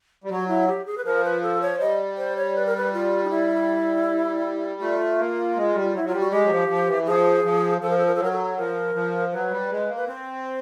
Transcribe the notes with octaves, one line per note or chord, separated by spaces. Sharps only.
G3
F#3 F#4
E4
G4
G#4
B4
F3 A#4
B4
A4
C#5
G3 D#5
C5
C#5
B4
A#4
B4
F4
D#4
E4
A3 F4
A#3
G#3
G3
F#3
E4
F#3
F4
G3
F#4
G#3 G4
F#3
F3
F3
E3
F3 G#4
F3
F3 A4
A#4
A4
A#4
A4
F#3 A#4
A4
F3 A#4
F3
F#3 B4
G3
G#3
A#3
B4
C4 C5